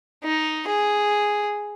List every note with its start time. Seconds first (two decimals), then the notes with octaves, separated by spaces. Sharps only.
0.24 D#4
0.68 G#4